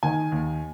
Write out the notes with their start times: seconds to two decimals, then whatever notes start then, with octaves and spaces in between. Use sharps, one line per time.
0.03 D#3 G#5
0.32 D#2